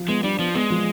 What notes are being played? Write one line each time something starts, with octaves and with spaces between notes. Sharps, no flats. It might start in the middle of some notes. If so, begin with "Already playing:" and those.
Already playing: F3
G#3 B3
G3 D4
F3 B3
G#3 B3
F3